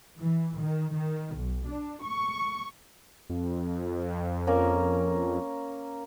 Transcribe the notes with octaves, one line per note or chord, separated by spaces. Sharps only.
E3
D#3
D#3
B1
D4
C#6
F2
A#3 C#4 A#4